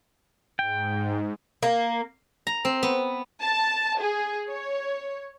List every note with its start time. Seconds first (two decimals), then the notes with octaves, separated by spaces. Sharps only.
0.59 G#2 G5
1.63 A#3
2.47 A#5
2.65 C4
2.83 B3
3.41 A5
4.00 G#4
4.48 C#5